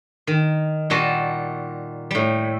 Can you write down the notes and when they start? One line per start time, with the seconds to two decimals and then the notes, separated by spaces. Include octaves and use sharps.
0.27 D#3
0.90 A#2 G3 F#4 D#5 A5
2.11 A2 G3